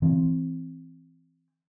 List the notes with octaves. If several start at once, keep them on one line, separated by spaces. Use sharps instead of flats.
E3 C4